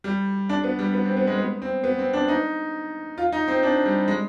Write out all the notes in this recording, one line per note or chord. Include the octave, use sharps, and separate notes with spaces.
G3
D4
B3
G3
B3
C4
B3
G#3
B3
C4
B3
C4
D4
D#4
F4
D#4
C4
D4
G3
G#3